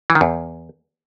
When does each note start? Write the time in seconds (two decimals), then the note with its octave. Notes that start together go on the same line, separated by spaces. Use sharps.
0.10 E3
0.15 D#3
0.21 E2